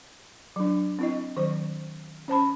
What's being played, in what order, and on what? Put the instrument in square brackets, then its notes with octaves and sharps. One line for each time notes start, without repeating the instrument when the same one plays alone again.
[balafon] F#3 D4
C4 E4 D#5
D#3 F#3 C5
C#4 C5 A5 B5